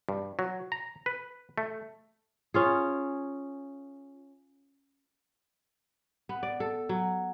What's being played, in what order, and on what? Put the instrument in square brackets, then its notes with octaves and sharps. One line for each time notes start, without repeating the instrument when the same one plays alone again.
[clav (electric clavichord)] G2
F#3
A#5
B4
A3
[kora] C#4 F4 G#4
B3
D5
A4
F#3